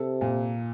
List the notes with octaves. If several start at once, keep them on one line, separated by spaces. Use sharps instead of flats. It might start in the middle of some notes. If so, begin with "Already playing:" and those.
Already playing: C3 A4
A#2